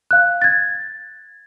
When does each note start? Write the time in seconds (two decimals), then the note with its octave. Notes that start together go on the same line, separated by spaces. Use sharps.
0.11 F5 F#6
0.42 G#6 A6